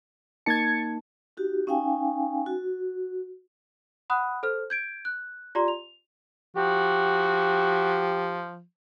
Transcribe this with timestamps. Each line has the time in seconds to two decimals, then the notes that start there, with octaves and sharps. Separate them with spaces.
0.46 A#3 D#4 A5 G#6 A6 C#7
1.37 D#4 F#4 G4
1.67 C#4 D#4 F5 G5 G#5
2.46 F#4
4.10 F#5 B5 D#6 F#6
4.43 A4 C5 F6
4.70 G6 G#6 D7
5.05 F#6
5.55 F4 G4 D5 A#5 C6
5.68 F7
6.57 F3 F#4 G4